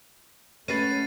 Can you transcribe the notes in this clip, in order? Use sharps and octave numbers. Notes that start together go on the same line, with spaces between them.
A3 C#4 F#4 B4 A6 C7 D#7